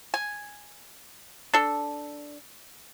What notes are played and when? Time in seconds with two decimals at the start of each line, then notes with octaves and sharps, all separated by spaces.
0.14 G#5
1.54 D4 A4